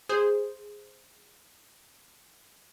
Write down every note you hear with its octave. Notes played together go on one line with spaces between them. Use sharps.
G#4 C5